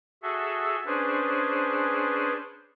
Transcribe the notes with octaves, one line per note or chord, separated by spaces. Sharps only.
F#4 G#4 A4 E5
C#4 D4 G#4 B4 C5